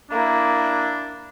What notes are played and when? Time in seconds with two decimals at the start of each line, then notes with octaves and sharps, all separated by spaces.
0.11 A#3 D4 E4